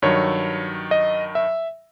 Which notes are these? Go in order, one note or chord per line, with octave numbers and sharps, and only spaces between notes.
G2 D#3 F#3 C#5
D#5
E5